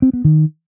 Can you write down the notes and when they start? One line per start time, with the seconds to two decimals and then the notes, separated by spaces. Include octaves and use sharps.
0.02 C4
0.13 B3
0.25 D#3